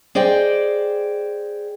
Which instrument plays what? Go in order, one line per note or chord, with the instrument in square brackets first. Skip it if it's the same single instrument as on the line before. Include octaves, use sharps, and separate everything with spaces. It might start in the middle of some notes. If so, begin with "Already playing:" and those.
[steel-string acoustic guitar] G#4 C5 D5 D#5 G5